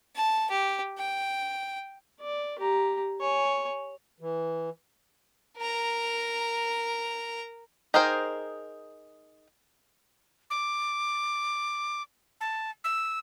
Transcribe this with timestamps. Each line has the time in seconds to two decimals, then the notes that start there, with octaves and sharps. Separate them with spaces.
0.16 A5
0.50 G4
0.98 G5
2.20 D5
2.59 G4 A#5
3.20 C#5 G#5
4.20 E3
5.57 A#4 A#5
7.94 D#4 G#4 A#4 C5 G5
10.50 D6
12.41 A5
12.84 E6